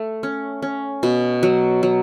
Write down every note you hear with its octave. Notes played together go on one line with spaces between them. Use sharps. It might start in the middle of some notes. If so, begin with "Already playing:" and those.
Already playing: A3
C#4
C#4
B2
F#3
F#3